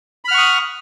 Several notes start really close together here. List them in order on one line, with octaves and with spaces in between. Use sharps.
B5 F6 F#5 C#6 D#6